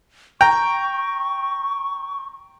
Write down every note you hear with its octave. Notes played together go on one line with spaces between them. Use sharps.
G5 A#5 C#6